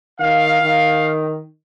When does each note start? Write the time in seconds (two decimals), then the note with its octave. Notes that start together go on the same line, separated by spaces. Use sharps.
0.20 D#3 F5
0.62 D#3